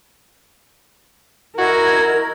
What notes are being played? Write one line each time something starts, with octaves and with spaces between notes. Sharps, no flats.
E4 F#4 A#4 D#5 G#6